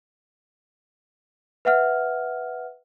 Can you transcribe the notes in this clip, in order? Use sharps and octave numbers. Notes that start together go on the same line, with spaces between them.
B4 E5 F#5 F6